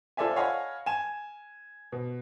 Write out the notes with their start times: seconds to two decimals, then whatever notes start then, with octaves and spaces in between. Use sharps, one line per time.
0.17 F4 A4 C5 D5 E5 G#5
0.36 C#5 D#5 F5 F#5 G#5 B5
0.86 G#5 E7
1.92 B2